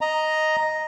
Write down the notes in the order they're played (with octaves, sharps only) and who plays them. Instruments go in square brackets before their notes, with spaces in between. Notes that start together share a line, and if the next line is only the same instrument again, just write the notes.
[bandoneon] D#5 A#5